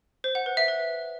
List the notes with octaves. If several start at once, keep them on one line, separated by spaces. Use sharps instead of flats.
C5
F#5
B4
E5
B4